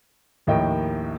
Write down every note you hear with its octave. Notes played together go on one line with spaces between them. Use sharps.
A#1 D#2 A2 A#3 D#5 G5